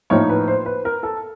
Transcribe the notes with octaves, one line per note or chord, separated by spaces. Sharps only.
A2 F3 A#3 D#4 C#5
B4
C5
B4
A#4
A4